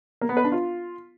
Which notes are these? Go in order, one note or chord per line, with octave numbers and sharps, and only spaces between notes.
A#3
B3
B4
D4
F4